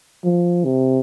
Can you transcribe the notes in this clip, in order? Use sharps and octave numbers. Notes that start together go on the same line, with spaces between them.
F3
C3